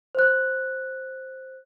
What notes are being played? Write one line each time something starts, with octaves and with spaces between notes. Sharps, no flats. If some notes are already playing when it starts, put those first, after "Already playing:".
C5 F#6